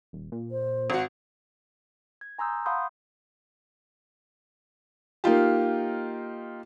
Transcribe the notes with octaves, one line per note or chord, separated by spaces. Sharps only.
D#1
A#2
C5
G#1 F#4
G#6
G#5 A#5 C6 D#6 E6 G6
F5 F#5 B5 C6 D#6 G6
A#3 D#4 F4 G4